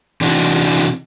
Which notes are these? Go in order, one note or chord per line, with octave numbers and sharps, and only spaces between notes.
C3 E3 D4 D#4 F#4